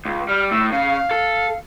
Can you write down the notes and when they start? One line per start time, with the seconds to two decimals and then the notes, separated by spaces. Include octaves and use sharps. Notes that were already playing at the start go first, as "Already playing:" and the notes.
0.05 C#2
0.29 G3 F6
0.51 A2 E6
0.72 C#3 F5
1.11 A4